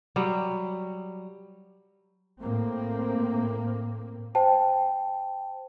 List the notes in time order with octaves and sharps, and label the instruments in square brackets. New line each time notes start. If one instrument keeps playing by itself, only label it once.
[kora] F#3 G3
[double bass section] A2 A#3 C4
[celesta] C5 G5 A5